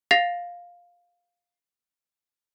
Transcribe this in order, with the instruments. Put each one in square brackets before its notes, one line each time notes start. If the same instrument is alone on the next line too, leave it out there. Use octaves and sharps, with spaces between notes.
[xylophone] F5 A6 A#6 C7 F7